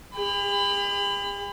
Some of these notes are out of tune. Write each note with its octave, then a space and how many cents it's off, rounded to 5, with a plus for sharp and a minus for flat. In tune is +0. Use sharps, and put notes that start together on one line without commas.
G4 +45 B5 +30